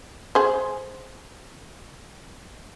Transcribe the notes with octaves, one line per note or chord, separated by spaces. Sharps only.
G#4 C5